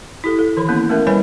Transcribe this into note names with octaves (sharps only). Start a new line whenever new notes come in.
E4 G4 A4
A4
D#3 E3 B5
A#3 B3 C#4 E4
A3 B3 C#4 A#4 E5
G3 E4 B4 C#5 G#5 B5